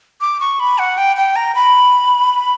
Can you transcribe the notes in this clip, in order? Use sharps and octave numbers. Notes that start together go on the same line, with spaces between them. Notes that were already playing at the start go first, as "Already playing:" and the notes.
D6
C#6
B5
F#5
G5
G5
A#5
B5